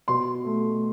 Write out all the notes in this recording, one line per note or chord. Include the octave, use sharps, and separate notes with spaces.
B2 C6
A3